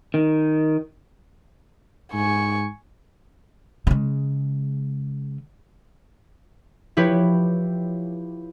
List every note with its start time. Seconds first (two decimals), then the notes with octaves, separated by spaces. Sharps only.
0.14 D#3
2.14 G#2 G#5 C#6
3.87 C#3 G#3
6.97 F3 E4 G4 B4 C#5